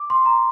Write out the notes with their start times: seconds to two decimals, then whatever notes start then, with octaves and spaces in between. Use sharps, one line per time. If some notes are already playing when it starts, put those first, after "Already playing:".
Already playing: D6
0.10 C6
0.26 A#5